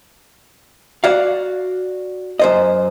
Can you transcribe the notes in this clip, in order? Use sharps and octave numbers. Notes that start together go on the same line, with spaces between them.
F#4 D5 F5
F#2 C5 D#5